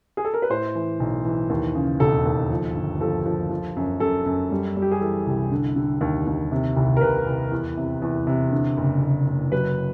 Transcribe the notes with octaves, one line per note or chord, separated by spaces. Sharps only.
G#4
A4
A#4
B4
A2 C5
E3
B1
E3
D#2
C#3
E1 A4
D#2
F3
G1
F3 A4
F3
F3
F#2
F#2 A4
F#2
G3
G3
G4
G#4
E3 A4
C2
D3
D3
D#2
D#2
C3
C2
A#4
C2 B4
C2
E2
C3
E2
C3
D3
F#1
F#1
F#1
F#3 B4